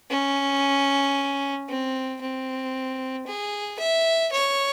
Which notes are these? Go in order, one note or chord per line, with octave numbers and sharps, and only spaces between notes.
C#4
C4
C4
G#4
E5
C#5